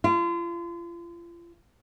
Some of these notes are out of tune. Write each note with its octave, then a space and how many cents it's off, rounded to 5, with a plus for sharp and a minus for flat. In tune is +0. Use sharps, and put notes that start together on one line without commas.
F4 -35